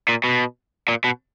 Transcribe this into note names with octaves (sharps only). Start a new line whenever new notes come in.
A#2
B2
A#2
B2